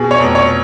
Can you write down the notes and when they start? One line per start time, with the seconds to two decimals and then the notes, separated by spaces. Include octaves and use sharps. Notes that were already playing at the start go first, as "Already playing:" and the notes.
Already playing: B2 G#4
0.11 C#5
0.19 F1
0.35 C#5